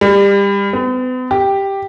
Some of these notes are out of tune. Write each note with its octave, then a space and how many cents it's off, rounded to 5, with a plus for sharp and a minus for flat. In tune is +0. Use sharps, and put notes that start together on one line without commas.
G3 +30
B3 +45
G4 +0